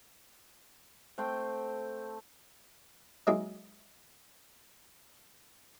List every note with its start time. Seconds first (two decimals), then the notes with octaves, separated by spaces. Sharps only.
1.18 A3 C4 C5 G5
3.27 F#3 G#3 A#3 D#4 G#4 E5